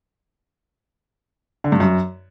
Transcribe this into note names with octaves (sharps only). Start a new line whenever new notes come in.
D3
G2
F#2